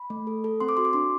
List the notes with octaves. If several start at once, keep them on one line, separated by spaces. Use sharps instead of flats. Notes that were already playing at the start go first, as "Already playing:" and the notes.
Already playing: B5
A3
A4
A4
C4 C6
D6
F#4 C6
D6
D4 C6